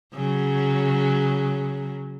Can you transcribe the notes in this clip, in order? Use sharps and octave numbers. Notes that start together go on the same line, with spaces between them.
C#3 F#3